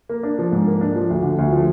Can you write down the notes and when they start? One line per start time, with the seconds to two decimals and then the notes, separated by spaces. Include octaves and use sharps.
0.09 A#3
0.23 D4
0.39 F3
0.52 G#2
0.67 A#3
0.81 D4
0.96 F3
1.10 D2
1.23 D3
1.39 D2
1.53 F3